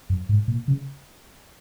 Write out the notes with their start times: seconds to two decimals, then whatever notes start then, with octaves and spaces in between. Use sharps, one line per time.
0.10 F#2
0.29 G#2
0.48 A#2
0.68 C#3